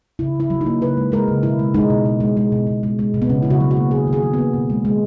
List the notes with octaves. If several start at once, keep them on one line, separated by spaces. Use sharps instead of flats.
C#3 E4
C#3 E4
F#3
D#4
A#3
C#3 B4
G#3
G#3 A#4
C#3
B2 E4
G#3
G#3 D#4
B2
B2
G#3
G#3
B2
B2
G#3
G#3
B2
B3
C#3 C#4
C#3 E4
F#4
F#3
F#4
A#3
D#3 G#4
D#3
G#4
F#3
B3
A#3
B2
G#3
G#3